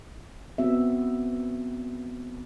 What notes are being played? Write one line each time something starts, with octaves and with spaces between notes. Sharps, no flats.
B3 C4 F#4 E5